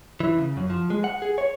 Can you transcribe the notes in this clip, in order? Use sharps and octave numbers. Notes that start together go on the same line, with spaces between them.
E3
C#3
F#2
F3
G#3
F#5
G#4
C#5